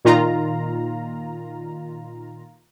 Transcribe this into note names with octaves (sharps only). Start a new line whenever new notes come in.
A#2 D#3 F4 A#5